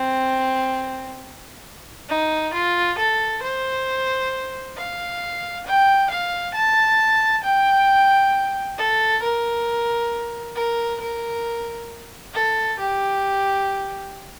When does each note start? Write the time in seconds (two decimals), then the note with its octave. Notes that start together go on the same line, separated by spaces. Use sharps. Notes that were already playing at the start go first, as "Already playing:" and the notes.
Already playing: C4
2.09 D#4
2.54 F4
2.98 A4
3.43 C5
4.77 F5
5.67 G5
6.10 F5
6.55 A5
7.44 G5
8.78 A4
9.23 A#4
10.56 A#4
11.01 A#4
12.34 A4
12.79 G4